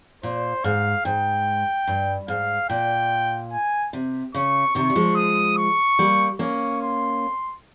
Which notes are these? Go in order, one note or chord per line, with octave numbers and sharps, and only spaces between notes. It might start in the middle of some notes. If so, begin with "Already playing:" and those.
A#2 C5
G#2 F5
G#2 G5
G2
G#2 F5
A#2 G5
G#5
C3
C#3 C#6
C3 D#3 C#6
G3
F3 G#3
D#6
C#6
G3 A#3
A#3 C#4 C#6
C6